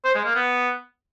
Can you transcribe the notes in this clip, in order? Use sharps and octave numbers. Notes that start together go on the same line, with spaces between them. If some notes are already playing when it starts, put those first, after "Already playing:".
C5
G#3
A#3
B3